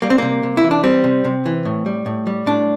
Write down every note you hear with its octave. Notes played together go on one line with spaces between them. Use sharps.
G3 A#3
C4
C3 A#3
C3
E4
E3
D4
G3 C4
C3
C3
E3
A2
G3
A2
G3
A2 D4